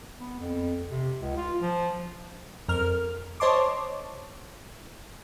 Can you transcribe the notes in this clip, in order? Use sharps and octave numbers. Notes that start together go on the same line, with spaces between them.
B3
F2
C3
C#2
F4
F3
F2 A#4 F6
C5 C#5 D#5 A5 C6 D6